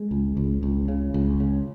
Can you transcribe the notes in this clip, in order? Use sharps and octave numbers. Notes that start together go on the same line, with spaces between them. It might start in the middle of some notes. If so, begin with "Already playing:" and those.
Already playing: G#3
C#2
C#2
C#2
C#3
C#2
C#3